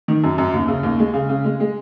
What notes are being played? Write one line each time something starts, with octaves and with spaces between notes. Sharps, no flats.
D#3
F#2
F#2
D#2
C#3
D#2
G#3
C#3
C#3
G#3
G#3